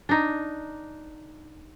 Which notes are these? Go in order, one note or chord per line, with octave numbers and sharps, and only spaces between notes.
D4 D#4